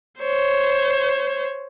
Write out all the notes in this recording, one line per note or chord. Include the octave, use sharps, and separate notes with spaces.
C5 C#5